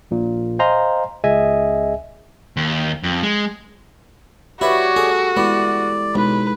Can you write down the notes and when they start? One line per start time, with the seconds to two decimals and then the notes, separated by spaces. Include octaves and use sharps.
0.11 A#1 A#2
0.59 C5 D#5 F5 G#5 A#5 C6
1.24 C#2 G#4 D#5 E5 G#5
2.57 D#2
3.03 F2
3.23 G#3
4.61 E4 F#4 G4 B4 C#5 D5
4.96 G#4 A4
5.37 G#3 B3 E4 D5
6.15 B1 G#3 D#4 B4